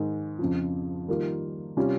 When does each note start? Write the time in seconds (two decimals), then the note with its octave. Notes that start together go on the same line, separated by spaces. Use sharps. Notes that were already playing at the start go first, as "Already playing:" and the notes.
Already playing: G#2 D#3 G#3
0.39 F2 C#3 F3
1.08 D#3 G3 A#3 F4
1.77 C3 G3 C#4 F4